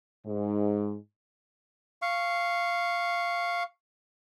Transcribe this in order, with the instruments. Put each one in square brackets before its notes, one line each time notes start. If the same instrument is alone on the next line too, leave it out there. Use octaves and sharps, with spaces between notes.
[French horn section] G#2
[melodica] F5 C#6